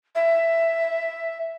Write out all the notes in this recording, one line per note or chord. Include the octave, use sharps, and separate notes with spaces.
E5